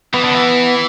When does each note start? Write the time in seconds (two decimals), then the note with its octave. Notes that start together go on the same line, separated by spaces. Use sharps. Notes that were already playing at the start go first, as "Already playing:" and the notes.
0.14 E3 B3
0.24 D3
0.35 E3